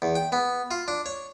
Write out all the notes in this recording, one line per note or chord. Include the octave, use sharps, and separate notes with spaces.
E2
G5
B3
F4
D4
C#5